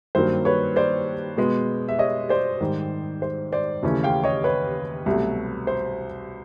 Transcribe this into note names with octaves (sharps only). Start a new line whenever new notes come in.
G2 D#3 F#3 A#3 C5
B4 C#5
C5 D5
B2 G#3 B3
E5
C#5 D#5
C5 D5
G#2 D#3 G3
C5
C5 D5
D#2 C#3 E3 A3 C#4
F5 G5
C#5 D#5
B4 C#5
C2 B2 F#3 A3
C5